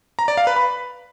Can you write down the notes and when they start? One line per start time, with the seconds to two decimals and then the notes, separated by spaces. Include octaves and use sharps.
0.19 A#5
0.28 D5
0.37 F5
0.47 B4
0.56 B5